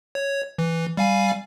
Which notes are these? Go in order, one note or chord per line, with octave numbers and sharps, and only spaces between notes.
C#5
E3
G3 F5 G#5